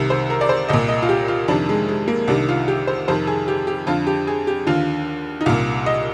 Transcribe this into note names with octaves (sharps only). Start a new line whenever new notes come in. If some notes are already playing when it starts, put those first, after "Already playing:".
Already playing: C2 C3 D#3
C5
A#4
D5
C5
C2 A#2 D#5
D#5
F4
G4
F4
F2 C3 D#3 D4
G#3
G#3
A#3
C2 C3 D#3 D4
F4
G4
C5
F2 C3 D#3 C5
G#4
G4
G4
F2 D3 F4
G4
G#4
G4
D#2 D3 F4
D#4
C2 A#2 F4
D#5